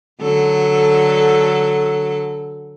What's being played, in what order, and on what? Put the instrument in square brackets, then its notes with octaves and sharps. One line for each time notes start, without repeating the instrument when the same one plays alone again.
[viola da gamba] D3 F#3 A4